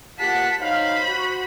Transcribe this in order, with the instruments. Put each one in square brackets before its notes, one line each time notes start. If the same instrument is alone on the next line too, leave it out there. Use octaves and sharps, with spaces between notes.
[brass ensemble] A#2 G4 F#5 [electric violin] A5 B6
[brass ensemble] F#3 D#4 F5 [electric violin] C5 B5
[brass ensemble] F#4